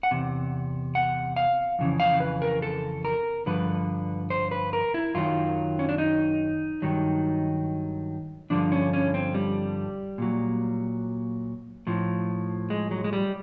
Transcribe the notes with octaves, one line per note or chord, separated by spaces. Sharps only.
F#5
E2 C3
F#5
F5
F2 C#3 E3
F5
B4
A#4
A4
A#4
G2 D3 F3 B4
C5
B4
A#4
E4
F#2 D#3 F#3 F4
C#4
D4
D#4
G2 D#3 F#3
G2 D3 F3 D4
C#4
C#4
C4
G3
A#2 F#3
A2 F3
G#3
F#3
G#3
G3